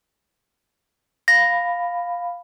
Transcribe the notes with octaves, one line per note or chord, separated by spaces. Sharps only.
F5 B5 A#6